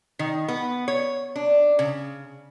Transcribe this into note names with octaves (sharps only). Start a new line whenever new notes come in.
D#3
B3
C#5
D4
C#3